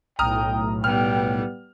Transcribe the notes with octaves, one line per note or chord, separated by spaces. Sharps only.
B1 A2 G5 A#5 D#6 F6
G3 B3 G5 F6